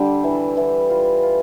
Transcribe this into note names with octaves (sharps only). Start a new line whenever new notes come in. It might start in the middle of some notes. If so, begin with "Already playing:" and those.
Already playing: D3 G3
E3
E3
F4
F4